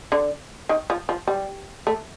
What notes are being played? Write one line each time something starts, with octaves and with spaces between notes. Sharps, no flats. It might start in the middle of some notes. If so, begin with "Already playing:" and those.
D3
D#3
F3
F3
G3
A3